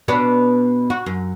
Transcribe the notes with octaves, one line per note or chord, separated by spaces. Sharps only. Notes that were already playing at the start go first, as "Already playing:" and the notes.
B2 B3 D4
F#4
F#2